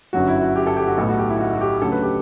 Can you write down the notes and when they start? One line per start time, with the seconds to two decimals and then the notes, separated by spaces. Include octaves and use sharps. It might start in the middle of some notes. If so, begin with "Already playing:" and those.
0.13 G1 F#2 D3 F#3 F#4
0.28 E4
0.41 F#4
0.56 G4
0.67 A4
0.77 G4
0.87 F#4
0.98 B1 A2 G3 B3 A4
1.09 F#4
1.19 G4
1.29 E4
1.39 F#4
1.54 F#4
1.61 G4
1.81 D2 C#3 F#3 A4
1.92 B4
2.03 G4